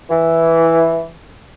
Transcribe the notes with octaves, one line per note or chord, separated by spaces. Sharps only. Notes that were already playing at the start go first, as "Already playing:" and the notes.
E3